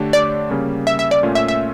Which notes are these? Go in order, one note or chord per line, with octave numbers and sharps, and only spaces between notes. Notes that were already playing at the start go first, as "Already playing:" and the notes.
Already playing: D3 A3 D4 G4 C#5
D5
C#3 G3 A#3 C#4
E5
E5
D5
A#2 A3 C#4 F4
E5
E5